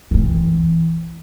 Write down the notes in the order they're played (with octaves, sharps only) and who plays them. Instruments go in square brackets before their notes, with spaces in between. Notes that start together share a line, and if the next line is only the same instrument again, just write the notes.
[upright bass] E3 C4